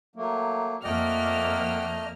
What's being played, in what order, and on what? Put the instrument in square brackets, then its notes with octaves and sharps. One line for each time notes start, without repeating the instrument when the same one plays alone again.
[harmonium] F#3 A3 A#3
[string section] F2 A#3 F6 [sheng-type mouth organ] A3 D5 D#5 [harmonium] F#5 G5